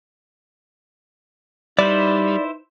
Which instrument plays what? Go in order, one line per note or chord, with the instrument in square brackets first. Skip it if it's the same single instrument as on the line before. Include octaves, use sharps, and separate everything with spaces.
[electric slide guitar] G3 [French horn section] D#4 [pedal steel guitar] E4 B4 C5 [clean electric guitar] D5